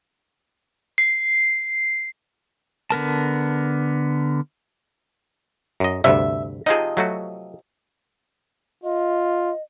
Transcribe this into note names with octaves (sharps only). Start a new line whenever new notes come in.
C7
D3 B3 A#4 A5
F#2 D#5
D2 G2 C3 E5
C3 F3 D#4 G#4 D#5
F#3 A3 F#4
F4 D#5